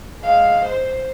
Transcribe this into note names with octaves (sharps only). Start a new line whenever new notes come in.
G#3 F5
C5